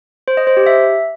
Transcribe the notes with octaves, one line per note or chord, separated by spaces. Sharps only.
C5
D#5
C5
G4
E5